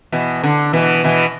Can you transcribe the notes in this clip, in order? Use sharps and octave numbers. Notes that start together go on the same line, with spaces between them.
B2 E3
D3
B2 E3
B2 E3